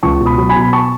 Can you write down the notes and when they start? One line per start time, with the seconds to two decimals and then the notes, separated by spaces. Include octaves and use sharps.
0.03 C#2 A5 C#6
0.20 B2
0.26 B5 D#6
0.38 F#3
0.49 G#5 B5
0.56 B2
0.62 B5
0.73 A5 C#6